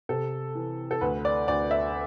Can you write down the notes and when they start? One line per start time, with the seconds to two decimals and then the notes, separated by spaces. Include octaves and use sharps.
0.09 C3 A4
0.55 E3
0.91 A4
1.01 D2 B4
1.25 D5
1.48 D2 D5
1.71 E5